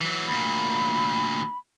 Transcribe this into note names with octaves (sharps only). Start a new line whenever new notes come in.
E3 F#3
D2 A#2 B5